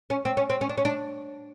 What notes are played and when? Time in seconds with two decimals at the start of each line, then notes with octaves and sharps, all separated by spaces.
0.10 C#4
0.25 C4
0.37 C#4
0.50 C4
0.61 C#4
0.69 D4
0.78 C#4
0.85 D4